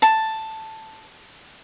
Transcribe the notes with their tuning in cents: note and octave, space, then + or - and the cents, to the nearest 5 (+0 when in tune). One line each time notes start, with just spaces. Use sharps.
A5 +5